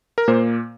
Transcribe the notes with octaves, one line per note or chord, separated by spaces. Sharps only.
A#4
A#2 A#3 C5